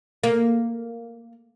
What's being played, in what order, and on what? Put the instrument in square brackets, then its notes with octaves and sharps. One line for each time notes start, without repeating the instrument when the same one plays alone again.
[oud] A#3